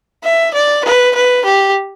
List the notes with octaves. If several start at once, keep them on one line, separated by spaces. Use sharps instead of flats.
E5
D5
B4
B4
G4